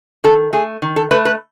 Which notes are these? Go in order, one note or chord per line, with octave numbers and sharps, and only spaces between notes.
D#3 A4
A3 G#4
D#3
A4
A3 B4
B4